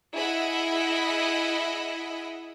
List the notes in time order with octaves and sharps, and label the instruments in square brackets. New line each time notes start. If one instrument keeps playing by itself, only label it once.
[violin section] E4 G#4 D#5 E5 F#5 B5